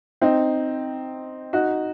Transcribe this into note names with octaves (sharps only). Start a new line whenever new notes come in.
C4 D#4
D#4 F#4